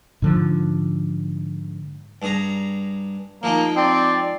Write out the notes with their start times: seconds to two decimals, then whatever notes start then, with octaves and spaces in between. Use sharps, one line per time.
0.22 G#2 D3 F3
2.22 G2 G#4 A#5
3.43 F3 G#3 A#3 D#4
3.76 C4 D5